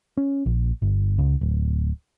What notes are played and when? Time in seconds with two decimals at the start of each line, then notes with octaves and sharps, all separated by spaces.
0.17 C#4
0.46 A#1
0.82 G1
1.18 C#2
1.41 D1